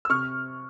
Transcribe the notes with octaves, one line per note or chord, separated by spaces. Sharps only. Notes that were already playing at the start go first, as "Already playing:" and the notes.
E6
C3 C#6 F6